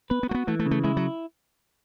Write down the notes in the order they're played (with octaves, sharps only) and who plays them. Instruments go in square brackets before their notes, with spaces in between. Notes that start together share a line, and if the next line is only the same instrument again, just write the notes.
[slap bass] B3 [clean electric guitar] B4
[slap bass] B3
[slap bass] A3 [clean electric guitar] F#4
[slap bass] B3
[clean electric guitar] E3 [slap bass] A3
[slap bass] A3
[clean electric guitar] C#3
[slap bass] A3
[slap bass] G#3 [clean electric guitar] E4
[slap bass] F#3